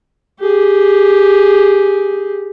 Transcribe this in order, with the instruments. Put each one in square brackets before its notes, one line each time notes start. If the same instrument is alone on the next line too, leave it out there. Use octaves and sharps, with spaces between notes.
[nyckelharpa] G4 G#4